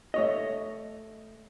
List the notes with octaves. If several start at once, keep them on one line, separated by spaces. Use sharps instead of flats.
A3 C#5 D#5